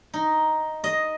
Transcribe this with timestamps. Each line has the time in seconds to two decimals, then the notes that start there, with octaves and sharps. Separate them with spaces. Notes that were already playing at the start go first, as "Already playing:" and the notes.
0.14 D#4
0.84 D#5